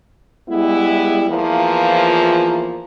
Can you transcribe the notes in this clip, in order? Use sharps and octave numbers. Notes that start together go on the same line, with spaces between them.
G3 G#3 B3 E4
E2 E3 F3 A#3 F4